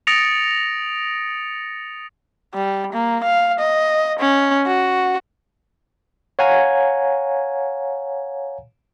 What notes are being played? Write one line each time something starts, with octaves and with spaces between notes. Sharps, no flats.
D#6 A6 A#6 C#7 D7 F7
G3
A#3
F5
D#5
C#4
F#4
C#5 F5 F#5 G#5 A#5 G#6